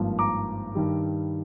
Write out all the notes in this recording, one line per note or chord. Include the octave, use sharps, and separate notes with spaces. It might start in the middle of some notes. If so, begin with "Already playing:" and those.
Already playing: G#1 G2 F3 A#3
A#5 D6
G2 D#3 G3